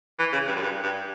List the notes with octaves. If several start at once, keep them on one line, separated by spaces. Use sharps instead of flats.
E3
C#3
G2
F#2
G2
G2